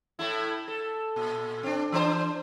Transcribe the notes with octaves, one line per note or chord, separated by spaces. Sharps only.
A2 A3 E4
A4
A#2
C4 D4
E3 D4 C5